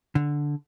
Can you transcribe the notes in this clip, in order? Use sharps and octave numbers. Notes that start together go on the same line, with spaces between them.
D3